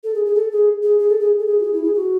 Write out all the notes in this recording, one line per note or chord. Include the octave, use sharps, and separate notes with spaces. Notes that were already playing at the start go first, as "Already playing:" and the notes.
A4
G#4
G#4
A4
G#4
G#4
G#4
A4
G#4
A4
G#4
F#4
G#4
E4
G#4
F#4